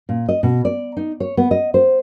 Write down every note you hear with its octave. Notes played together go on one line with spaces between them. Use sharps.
A#2
D#5
B2
D5
D#4
C#5
B3
D#5
C5